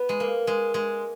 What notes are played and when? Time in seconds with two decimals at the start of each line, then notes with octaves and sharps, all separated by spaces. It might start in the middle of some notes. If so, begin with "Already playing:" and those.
Already playing: B3
0.09 G#3
0.20 A#3
0.47 G#3
0.74 G#3